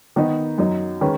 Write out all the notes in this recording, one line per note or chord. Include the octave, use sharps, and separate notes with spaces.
D#3 B3 D#4
F#2 F#3 D#4
D#3 G#3 C#4 B4